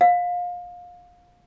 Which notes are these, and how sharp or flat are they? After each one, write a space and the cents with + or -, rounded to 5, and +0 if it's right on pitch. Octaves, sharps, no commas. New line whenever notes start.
F5 +25